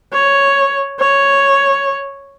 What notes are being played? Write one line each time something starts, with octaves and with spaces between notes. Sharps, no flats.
C#5
C#5